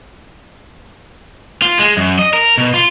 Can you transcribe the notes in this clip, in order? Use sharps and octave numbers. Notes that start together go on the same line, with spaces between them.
F4
G#3
F#2
D#5
A#4
B2
F4